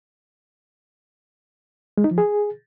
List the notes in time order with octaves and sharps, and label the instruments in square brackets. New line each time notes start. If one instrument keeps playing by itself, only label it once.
[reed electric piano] G#3
D#4
F3
G#4